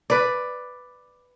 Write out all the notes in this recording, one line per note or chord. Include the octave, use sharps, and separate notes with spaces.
B4 D5